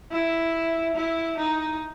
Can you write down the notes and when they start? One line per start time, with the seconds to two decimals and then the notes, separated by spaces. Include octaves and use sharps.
0.11 E4
0.95 E4
1.37 D#4